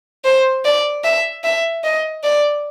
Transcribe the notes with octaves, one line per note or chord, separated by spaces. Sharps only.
C5
D5
E5
E5
D#5
D5